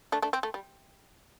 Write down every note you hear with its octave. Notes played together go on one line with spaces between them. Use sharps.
A3 D4
A3 D4
C4
A3
G3